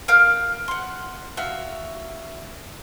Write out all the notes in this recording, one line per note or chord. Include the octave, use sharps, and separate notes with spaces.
A#4 F5 F6 G6
F#5 C6
F#4 E5 F5